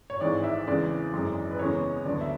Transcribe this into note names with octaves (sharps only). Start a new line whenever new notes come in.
C#5
G#1 G#2 E3 G#3 D5
E5
E2 C#3 E3 G#3 D5
G#1 F#2 E3 G#3
B4
E2 C#3 G#3 B3 C#5
D2 D3 F#3 B3 D5
E5